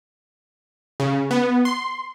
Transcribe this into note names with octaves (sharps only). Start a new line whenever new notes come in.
C#3
B3
C6